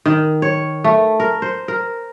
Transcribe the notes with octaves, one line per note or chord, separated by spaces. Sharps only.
D#3
C#5
A3
A#4
C5
A#4